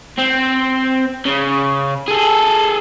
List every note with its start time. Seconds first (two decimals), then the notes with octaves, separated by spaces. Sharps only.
0.18 C4
1.26 C#3
2.08 G#4 A4